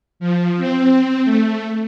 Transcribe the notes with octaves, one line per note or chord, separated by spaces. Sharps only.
F3
C4
A3